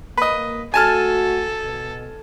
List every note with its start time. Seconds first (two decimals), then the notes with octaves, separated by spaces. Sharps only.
0.17 A#3 B4 D#5
0.74 A3 F#4 A4 G#5 A5 F6
1.65 B2